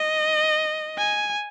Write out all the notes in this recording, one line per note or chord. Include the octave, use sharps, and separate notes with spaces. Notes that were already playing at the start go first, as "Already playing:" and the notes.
Already playing: D#5
G#5